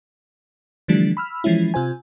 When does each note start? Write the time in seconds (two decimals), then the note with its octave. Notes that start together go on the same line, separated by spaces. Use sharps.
0.88 D3 E3 F3 G3 A3 D4
1.17 B5 E6 F6
1.44 E3 F3 G#3 C#4 E4
1.74 C3 F4 C5 G#5